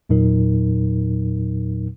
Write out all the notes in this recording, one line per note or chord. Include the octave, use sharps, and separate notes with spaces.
E2 A#2 F#3 D#4 A#4